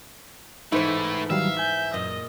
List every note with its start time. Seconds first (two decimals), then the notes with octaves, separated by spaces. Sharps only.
0.72 G#2 E3 A3 D#4 E4 B4 C5
1.30 D#3 F#3 G3 E5 F5
1.59 G#5 G6
1.94 F#2 A#2 D#5